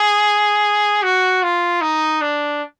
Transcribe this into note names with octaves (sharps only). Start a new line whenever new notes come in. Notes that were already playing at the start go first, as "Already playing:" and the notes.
Already playing: G#4
F#4
F4
D#4
D4